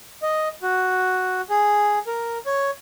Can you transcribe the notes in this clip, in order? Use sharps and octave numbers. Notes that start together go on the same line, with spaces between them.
D#5
F#4
G#4
A#4
C#5